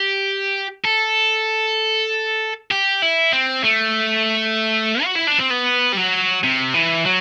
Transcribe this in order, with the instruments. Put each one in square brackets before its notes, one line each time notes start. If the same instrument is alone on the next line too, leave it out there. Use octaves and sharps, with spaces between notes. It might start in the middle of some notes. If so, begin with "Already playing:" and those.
Already playing: [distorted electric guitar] G4
A4
G4
E4
C4
A3
F#4
E4
D4
C4
B3
G3
F#3
C3
E3
F#3